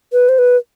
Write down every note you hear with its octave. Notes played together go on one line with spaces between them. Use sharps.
B4
C5
B4